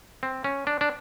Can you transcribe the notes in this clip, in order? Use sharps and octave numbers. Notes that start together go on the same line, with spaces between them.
C4
C#4
D4
D4